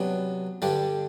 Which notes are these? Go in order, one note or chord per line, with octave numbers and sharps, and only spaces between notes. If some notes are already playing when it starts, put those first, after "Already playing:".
Already playing: C3 F#3 B3 D4
G2 D3 G3 D4 G4